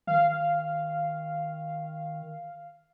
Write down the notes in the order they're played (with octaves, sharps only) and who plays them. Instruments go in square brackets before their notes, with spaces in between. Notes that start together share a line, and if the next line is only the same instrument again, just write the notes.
[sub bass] D#3 [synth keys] F5